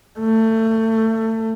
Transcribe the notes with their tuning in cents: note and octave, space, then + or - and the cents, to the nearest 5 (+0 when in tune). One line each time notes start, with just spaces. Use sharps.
A3 +25